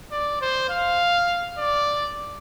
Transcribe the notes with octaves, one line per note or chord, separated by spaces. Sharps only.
D5
C5
F5
D5